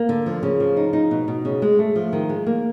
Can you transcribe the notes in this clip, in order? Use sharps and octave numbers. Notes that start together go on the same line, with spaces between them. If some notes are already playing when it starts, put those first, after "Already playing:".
Already playing: A#3
D3
F3
C#3
F3
D#4
D#4
B2
B2
C#3
G#3
A3
F3
D#3
G#3
A#3